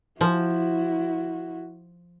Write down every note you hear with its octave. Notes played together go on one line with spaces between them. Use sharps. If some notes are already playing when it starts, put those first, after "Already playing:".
F3 E4 F#4